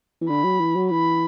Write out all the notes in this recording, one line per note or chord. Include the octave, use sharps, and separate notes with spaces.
E3
D3 B5
F#3
E3
F#3
E3 B5